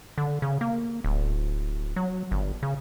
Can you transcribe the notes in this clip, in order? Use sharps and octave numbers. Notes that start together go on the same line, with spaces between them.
D3
C#3
A#3
D1
F#3
G1
C#3